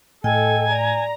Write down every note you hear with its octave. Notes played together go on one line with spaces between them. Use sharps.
A2 A4 D#5 G5 G#5
D5 A#5